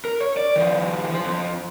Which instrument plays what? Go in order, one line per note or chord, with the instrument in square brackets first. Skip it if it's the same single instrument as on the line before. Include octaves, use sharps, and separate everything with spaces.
[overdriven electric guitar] A#4
C#5
D5
D#3 F3
F3 C5
F2